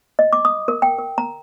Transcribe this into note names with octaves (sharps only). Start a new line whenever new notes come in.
D#5
D6
D#6
A#4
G5
A#4
A#5